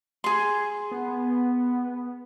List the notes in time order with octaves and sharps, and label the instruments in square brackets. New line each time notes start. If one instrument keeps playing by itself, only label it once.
[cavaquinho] G#4 C6
[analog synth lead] B3